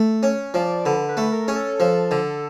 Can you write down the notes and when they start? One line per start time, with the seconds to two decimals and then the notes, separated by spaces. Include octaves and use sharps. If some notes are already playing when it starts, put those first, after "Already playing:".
Already playing: A3
0.23 C#4
0.54 F3 D5
0.85 D3 B4
1.09 B4
1.17 A3
1.32 A#4
1.48 C#4 G#4
1.56 A4
1.80 F3
2.11 D3